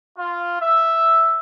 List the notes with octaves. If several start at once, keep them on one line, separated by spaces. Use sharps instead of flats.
F4
E5